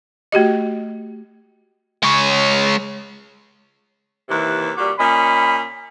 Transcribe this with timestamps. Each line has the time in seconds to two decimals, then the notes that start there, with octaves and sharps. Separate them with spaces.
0.32 A3 F#4 G4 D#5
2.03 G#3 C#5
4.28 D#2 C3 E3
4.76 A#2 G3 F#4 D6
4.99 A#2 C#4 D#5 B5